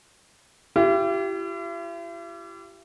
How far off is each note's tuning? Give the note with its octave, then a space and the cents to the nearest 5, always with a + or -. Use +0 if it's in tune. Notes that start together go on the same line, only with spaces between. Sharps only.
E4 +45 G4 -20